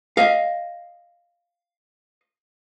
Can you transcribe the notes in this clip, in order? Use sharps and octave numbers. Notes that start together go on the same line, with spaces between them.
D#5 F5